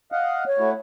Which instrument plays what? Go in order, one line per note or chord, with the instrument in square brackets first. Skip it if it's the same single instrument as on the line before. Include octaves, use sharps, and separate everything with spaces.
[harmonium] D#5 F5 F#5
[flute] C#5
[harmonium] A3 E4 F#4